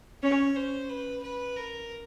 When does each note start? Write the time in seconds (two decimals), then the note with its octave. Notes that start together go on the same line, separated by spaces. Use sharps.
0.23 C#4 C#5
0.56 C5
0.89 B4
1.23 B4
1.56 A#4